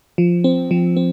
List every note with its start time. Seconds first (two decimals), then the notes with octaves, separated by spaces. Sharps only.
0.18 F3
0.44 C4
0.71 F3
0.97 C4